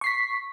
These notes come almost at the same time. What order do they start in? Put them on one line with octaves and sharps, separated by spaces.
C#6 C7 B6